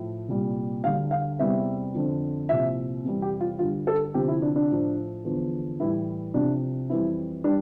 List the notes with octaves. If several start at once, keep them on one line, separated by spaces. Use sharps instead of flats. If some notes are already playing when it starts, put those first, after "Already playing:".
Already playing: A2 F3
C2 A#2 G3
D2 D3 G3 F5
F5
E2 C3 E3 G3 E5
F2 D3 F3
C2 A#2 F3 E5
F2 C3 E3 G3
G4
F4
G2 D3 G3 F4
A4
D2 C3 F3 G4
E4
D4
D4
A2 F3
E2 D3 F3
A2 E3 G3 E4
C2 C3 F3 D4
F2 E3 G3 E4
E3 G3 D4